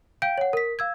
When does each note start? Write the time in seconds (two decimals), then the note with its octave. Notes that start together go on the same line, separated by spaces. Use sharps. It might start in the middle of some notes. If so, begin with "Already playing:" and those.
0.22 F5 G5 G6 D7
0.38 C#5 F#5
0.53 A#4 B6
0.79 F5 E6 G#6